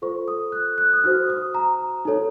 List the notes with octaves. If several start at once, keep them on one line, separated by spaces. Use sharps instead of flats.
F4 A4 C5 C#6
D#6
F#6
F#6
D#6
D#4 F#4 C5 F6
D#6
A#5
D#4 A4 C#5